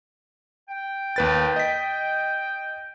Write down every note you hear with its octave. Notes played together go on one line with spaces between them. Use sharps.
G5
D#2 B4 A6
D#5 B6